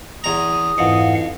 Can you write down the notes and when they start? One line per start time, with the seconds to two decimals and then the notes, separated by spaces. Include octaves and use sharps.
0.24 E2 A#5 D#6
0.78 F2 G#2 E3 F5 F#5